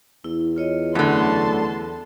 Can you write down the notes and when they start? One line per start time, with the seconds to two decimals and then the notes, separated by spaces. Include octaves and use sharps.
0.24 E2 E4
0.56 F4 C#5 D#5
0.95 F#2 D3 A3 A5 B5 C6